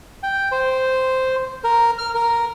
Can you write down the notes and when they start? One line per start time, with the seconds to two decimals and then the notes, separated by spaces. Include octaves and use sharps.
0.23 G5
0.52 C5
1.64 A#4
1.99 F6
2.15 A#4